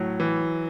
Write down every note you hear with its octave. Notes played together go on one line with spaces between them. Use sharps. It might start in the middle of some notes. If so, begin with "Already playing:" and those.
Already playing: A2 F#3
E3